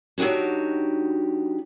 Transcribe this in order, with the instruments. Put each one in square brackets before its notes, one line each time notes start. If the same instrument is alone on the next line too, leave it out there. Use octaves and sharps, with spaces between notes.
[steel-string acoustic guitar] F#3 D4 D#4 F#4 G4